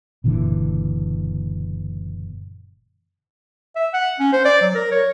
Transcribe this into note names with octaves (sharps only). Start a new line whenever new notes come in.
F#1 A#2 D3 E3
E5
F#5
C#4
C5
D5
F#3
A#4
C#5